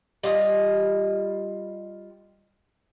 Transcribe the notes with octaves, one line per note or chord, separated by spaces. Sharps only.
G3 F4 D#5